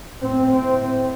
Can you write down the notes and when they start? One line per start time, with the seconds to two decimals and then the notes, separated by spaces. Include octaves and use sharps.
0.22 A2 C4
0.55 C4